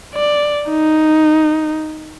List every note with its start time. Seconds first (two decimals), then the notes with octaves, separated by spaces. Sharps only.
0.15 D5
0.70 D#4